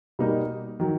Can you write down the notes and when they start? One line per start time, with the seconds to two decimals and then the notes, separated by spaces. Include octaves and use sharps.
0.19 B2 G3 A#3 D#4
0.80 D#3 F#3